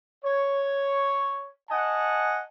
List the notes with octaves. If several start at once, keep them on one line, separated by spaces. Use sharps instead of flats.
C#5
D#5 F#5 G#5 A5